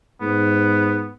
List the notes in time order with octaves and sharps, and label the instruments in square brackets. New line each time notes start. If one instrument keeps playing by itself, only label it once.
[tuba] G#2 [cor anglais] B3